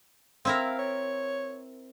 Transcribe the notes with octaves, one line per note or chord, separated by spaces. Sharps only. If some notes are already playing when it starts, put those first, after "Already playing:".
C4 E4 A#4 F5
C#5